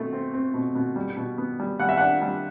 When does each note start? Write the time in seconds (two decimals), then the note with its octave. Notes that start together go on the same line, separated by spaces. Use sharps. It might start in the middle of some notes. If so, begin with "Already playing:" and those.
Already playing: B2 A3 C4
0.13 C4
0.34 C4
0.54 B2
0.75 B2
0.96 G3
1.17 B2
1.38 B3
1.60 G3
1.79 G3 F#5
1.89 E5
1.97 D4 F#5
2.22 G3